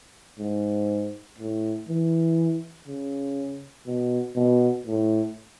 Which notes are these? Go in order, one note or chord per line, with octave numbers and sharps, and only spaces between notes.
G#2
A2
E3
C#3
B2
B2
A2